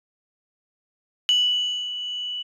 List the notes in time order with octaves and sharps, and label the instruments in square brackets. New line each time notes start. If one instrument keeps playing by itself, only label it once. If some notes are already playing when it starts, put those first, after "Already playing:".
[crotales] F#7